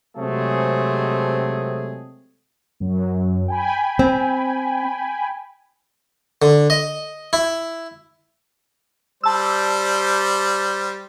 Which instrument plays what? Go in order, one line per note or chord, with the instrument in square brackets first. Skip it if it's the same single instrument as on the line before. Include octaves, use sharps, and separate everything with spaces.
[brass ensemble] C3 F#3 G#3 A3 C4 G#4
[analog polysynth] F#2 F#3
G5 G#5 B5
[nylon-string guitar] C4
[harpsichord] D3
D#5
E4
[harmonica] G3 C5 D5 [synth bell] A5 E6